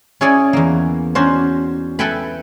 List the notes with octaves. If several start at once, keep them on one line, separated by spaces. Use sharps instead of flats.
C#4 E4 G#4 C#5 D5 G#5
E2 A#3
C#4 D4 F#4 A#4 C5
A4 B4 E5 G5 G#5 B5